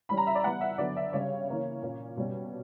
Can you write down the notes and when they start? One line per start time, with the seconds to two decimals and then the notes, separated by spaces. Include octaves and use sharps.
0.09 E3 G3 C#4 B5
0.17 A#5
0.27 E5
0.35 D5
0.44 E3 G3 B3 F#5
0.61 E5
0.78 D3 F#3 B3 D4 D5
0.97 E5
1.13 C#3 G3 C#4 C#5
1.48 E3 A#3 C#4
1.83 A#2 A#3 C#4
2.17 B2 G3 C#4